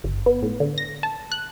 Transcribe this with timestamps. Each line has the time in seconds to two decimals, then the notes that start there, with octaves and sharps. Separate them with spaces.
0.04 G1
0.26 B3
0.42 A2
0.60 D3
0.78 A#6
1.03 A5
1.32 F#6